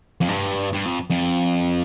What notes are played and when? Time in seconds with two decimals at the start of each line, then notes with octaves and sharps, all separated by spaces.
0.21 F2
0.28 G2
0.73 G2
0.85 F2
1.10 F2